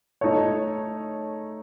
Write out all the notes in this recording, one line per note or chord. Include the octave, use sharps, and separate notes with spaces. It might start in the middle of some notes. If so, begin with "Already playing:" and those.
A3 D#4 A4 C#5